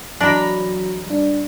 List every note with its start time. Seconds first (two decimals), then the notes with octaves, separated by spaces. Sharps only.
0.21 E3 F#3 D4 D#5 A#5 B5
1.06 G3 D4